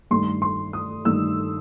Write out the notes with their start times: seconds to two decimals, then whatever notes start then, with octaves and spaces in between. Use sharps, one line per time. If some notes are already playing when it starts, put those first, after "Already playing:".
0.11 G2 D#3 A3 C6
0.42 C6
0.73 D#6
1.05 G2 D#3 A3 E6